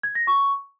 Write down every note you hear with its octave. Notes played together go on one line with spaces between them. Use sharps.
G#6
A#6
C#6